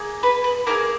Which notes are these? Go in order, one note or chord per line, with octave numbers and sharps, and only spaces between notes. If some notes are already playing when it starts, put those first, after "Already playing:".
Already playing: A#3 G#4
B4
B4
A#3 F4 G#4 A#4